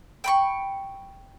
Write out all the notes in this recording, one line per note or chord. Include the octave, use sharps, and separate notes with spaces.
G5 B5 C#6